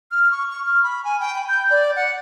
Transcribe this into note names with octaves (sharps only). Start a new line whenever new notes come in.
F6
C#6
C#6
F6
B5
G#5
G5
B5
G6
D5
F#5